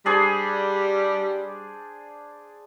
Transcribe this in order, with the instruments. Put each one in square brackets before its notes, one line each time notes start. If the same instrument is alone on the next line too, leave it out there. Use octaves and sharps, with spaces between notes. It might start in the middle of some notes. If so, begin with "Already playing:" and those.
[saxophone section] G3 [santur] D4 G#4 C5